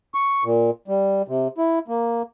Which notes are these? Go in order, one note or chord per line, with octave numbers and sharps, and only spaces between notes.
C#6
A#2
G3
C3
E4
A#3